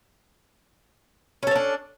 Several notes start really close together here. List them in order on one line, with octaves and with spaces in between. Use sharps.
C#4 A4 C#5 D4